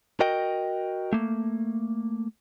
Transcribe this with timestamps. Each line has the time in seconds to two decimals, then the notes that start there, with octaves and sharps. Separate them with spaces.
0.20 F#4 A#4 D#5 G5
1.13 A3 A#3